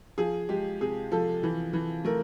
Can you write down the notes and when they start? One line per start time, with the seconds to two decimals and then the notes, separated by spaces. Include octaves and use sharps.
0.18 F3 G#4
0.49 G#3 G4
0.81 C3 G#4
1.12 F3 A4
1.43 E3
1.73 E3
2.05 A3 A#4